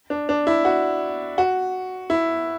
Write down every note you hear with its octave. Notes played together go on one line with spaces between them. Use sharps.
D4
D4
E4
F#4
F#4
E4